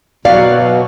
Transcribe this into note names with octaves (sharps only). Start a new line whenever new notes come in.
B2 F#3 D5 F5